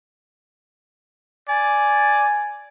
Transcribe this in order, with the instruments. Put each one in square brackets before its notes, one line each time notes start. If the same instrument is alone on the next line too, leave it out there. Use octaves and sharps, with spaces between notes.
[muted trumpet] D5 [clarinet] G#5